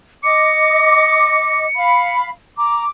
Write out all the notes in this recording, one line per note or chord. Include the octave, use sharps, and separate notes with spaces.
D#5 D6 C#7
F5 B5
A#5 D6